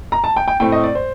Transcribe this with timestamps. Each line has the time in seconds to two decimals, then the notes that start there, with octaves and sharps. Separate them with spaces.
0.12 A#5
0.24 A5
0.36 G5
0.48 G5
0.60 A2 A3 C4 G5
0.72 D#5
0.84 D5
0.95 C5